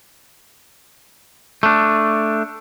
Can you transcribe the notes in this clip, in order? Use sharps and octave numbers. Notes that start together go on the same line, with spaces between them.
A3 D4